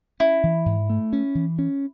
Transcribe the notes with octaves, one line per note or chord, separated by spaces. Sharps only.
C#4 E4
E3
G#2
A3
C#4
E3
C#4